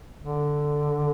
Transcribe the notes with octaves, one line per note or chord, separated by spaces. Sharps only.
D3